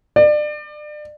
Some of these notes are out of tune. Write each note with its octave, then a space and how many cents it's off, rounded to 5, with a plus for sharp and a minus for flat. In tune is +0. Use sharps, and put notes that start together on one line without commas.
D5 +30